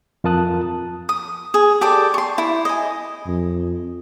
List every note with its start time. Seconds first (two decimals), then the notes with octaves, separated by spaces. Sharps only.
0.24 F2 F4 A#4 A5 D#6 F#6
1.09 D#6
1.54 G#4
1.81 G4 A4 C5 D5
2.14 C6 C#6
2.38 E4
2.65 D#5 G#5
3.26 F2